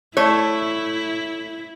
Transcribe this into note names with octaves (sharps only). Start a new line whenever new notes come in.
A3 E4 C#5